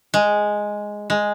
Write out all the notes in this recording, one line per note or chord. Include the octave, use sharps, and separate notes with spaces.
G#3
G#3